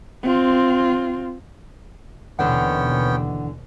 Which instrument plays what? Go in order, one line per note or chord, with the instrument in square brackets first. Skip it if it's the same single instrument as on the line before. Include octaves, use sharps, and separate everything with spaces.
[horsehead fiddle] C4 F4
[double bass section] D#2 B2 [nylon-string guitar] D3 E3 [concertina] B3 C#4 G5 [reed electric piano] F#5